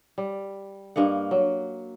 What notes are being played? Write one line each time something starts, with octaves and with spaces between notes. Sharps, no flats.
G3
G2 A#3 D#5 F#5
F#3